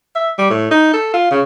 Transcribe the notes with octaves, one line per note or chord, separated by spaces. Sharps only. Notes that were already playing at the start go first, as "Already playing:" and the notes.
E5
G3
A2
D#4
A4
F4
C#3